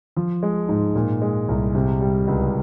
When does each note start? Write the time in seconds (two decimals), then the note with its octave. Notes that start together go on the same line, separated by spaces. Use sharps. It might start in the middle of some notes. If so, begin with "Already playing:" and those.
0.17 F3
0.43 G#3
0.69 G#2
0.95 A#2
1.22 G#3
1.48 C2
1.75 C3
2.01 G3
2.27 C#2